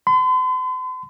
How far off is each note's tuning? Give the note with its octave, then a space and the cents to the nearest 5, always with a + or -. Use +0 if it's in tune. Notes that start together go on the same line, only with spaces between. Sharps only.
C6 -45